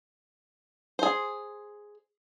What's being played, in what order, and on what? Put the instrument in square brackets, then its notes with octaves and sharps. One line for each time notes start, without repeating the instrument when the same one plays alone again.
[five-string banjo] G#4 C5